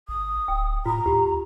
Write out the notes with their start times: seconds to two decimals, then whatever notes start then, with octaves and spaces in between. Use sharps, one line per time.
0.09 G#1 D#6
0.48 D1 G5
0.86 A2 F4 A#5
1.06 D#2 F4 G4